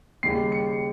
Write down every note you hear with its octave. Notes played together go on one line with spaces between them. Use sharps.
D#2 C#3 G3 C7
C#7